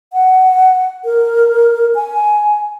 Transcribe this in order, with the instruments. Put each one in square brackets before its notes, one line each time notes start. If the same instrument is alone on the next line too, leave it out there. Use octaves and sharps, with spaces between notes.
[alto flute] F#5
A#4
G#5